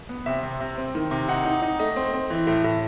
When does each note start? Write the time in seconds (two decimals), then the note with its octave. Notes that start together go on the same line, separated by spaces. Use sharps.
0.09 B3
0.26 C3 E5
0.43 C3
0.60 C3
0.78 C4
0.95 D#3
1.11 C3
1.28 D#4 F#5
1.45 D#4
1.62 D#4
1.79 A3 D#5
1.96 C4
2.13 C4
2.30 E3
2.47 A2
2.64 A2